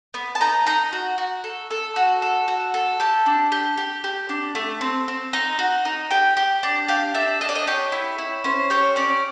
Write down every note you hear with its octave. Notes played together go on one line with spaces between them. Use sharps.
B3
A5
D#4 A#5
D#4 A#5
F#4
F#4
A4
A4
F#4
A4
F#4
A4
G4 A5
D4
G4
G4
G4
D4
A3
C4
C4
D#4
F#4
D#4
G4 G5
G4
D4
G4 F5
D4 E5
D4 D#5
D5
D#5
G4 C#5
E4
E4
C#4 C5
G4 C#5
C#4 D5